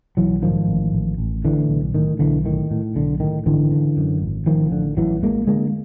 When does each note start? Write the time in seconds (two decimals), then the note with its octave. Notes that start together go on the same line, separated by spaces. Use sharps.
0.17 B1 E3 F#3
0.42 G#2 D#3 F3
0.68 A1
0.93 A1
1.18 A1
1.44 A2 D3 E3
1.69 B1
1.95 A2 D#3
2.19 B1 D3 E3
2.45 A2 D#3
2.71 A2
2.95 B1 D3
3.20 A2 D#3
3.46 G#1 D3 E3
3.71 C#3
3.97 F#2
4.22 G#1
4.46 A1 D#3 F3
4.72 D3
4.97 A1 E3 F#3
5.23 A1 G#3 A#3
5.47 D3 G#3 A#3